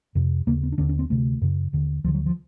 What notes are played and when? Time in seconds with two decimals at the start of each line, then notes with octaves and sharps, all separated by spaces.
0.15 F2 C3
0.47 D#2 C#3 A#3
0.63 B3
0.72 D4
0.78 D#2 D3 C#4
0.89 C#4
0.99 C4
1.10 D2 C3 A3
1.41 F#2 C#3
1.73 D#2 D3
2.04 D2 F3
2.07 D3
2.14 F#3
2.26 F3